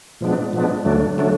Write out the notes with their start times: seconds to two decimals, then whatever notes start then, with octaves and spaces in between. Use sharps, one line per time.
0.21 A#2 F3 G#3 B3 D4
0.53 A#2 F3 G#3 B3 D4
0.85 D2 D3 F#3 A3 D4
1.18 D3 F#3 A3 D4